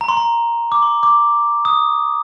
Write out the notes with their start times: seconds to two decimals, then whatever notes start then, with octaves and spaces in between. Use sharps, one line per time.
0.01 A#5
0.08 C6
0.17 A#5
0.72 D6
0.82 C6
1.03 D6
1.65 D#6